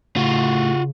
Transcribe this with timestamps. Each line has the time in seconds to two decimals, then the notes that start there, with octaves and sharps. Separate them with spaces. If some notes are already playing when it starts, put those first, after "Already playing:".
0.16 A2 C#3 F4 F#4